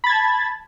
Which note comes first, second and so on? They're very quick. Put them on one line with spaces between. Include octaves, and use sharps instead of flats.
B5 A6 G#6 A5